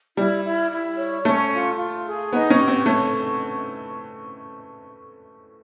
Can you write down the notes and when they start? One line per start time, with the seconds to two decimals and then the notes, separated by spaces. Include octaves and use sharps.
0.17 G3 E4
0.44 E4
0.71 E4
0.98 C#5
1.25 A3 C#4
1.52 F4
1.78 F4
2.05 G#4
2.32 B3 D#4
2.50 C#4
2.59 G4
2.68 C4
2.86 A3 C#5